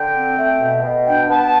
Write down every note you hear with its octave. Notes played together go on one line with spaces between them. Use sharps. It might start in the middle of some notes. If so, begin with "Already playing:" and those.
Already playing: D3 G5
C4
A3
B2
B2
D4 G5
B3 A5